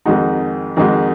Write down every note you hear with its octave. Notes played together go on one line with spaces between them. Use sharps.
F2 D#3 G#3 D#4 F#4
F2 D#3 G#3 D#4 F#4